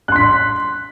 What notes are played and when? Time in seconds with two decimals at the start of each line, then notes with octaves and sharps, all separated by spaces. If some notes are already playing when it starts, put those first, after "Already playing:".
0.08 F#6
0.12 C6
0.16 B6